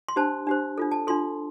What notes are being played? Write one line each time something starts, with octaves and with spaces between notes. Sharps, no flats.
C6
D4 G4 C5 A5
D4 G4 C5
D4 F4 A4
A5
D4 F4 A4 C6